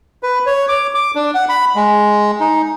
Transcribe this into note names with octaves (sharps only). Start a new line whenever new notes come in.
B4
C#5
D6
D6
D4
F#5
B5
G#3
D#4